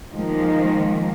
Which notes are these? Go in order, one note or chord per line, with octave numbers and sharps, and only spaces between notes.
D#3 F3 G#3 A#3